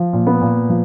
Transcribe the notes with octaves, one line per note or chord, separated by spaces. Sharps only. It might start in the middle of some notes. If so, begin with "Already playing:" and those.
Already playing: F3
A#2
B3
A#2
F3